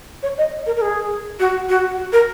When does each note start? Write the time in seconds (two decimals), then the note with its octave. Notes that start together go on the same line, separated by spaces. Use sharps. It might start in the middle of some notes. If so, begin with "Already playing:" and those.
0.23 C#5
0.38 D#5
0.66 A#4
0.77 A#4
0.82 G#4
1.40 F#4
1.69 F#4
1.97 F#4
2.13 A#4